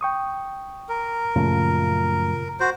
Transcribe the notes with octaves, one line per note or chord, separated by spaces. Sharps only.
G5 C#6 D#6
A#4
F#2 A#2 C#3 F3 A3 F4
F#4 C5